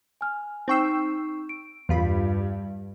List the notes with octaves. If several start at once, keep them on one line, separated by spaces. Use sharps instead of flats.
G#5 F6
C4 D#4 G5 C#6 E6 C7
D7
E2 G2 F4 B5